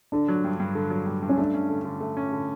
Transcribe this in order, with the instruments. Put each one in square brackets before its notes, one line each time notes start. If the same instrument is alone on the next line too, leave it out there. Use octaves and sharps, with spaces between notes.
[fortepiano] D3 [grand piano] D4
[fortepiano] F#3
G2
G2
D3
F#3
G2
G2
[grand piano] C#4
[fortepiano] A3 [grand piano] D4
[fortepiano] C#4
D3
D3
A3
C#4
D3